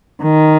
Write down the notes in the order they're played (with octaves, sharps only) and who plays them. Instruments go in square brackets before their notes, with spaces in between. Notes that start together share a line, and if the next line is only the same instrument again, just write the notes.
[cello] D#3